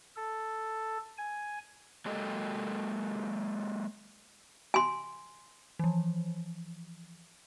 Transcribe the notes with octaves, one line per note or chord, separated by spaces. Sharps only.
A4
G#5
F#3 G#3 A#3 G4 A4 D#5
G#5 C6
E3 F3